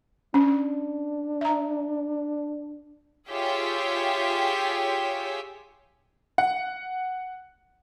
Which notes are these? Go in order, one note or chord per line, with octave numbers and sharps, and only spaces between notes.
C#4 D4
E5 A#5
F4 G4 G#4 C#5 E5 G5
F#5